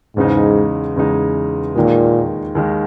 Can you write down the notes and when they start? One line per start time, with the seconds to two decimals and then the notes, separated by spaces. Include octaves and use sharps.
0.16 E2 G#2 C#3 G#3 D#4
0.96 E2 C#3 G#3 D#4
1.75 D#2 A#2 D#3 G#3
2.55 D#2 D#3 G#3